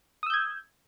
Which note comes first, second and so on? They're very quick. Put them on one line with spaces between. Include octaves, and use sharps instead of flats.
D#6 E6 G6 G#6